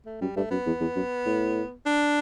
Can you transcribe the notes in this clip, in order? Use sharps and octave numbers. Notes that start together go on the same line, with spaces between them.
A3
F#2 G3
G2 A3
F#2 B3
E2
E2
F#2
A2
D4